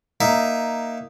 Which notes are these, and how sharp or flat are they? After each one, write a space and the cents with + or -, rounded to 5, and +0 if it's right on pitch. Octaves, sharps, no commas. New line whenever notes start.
A#3 +0 D#4 -5 E5 +0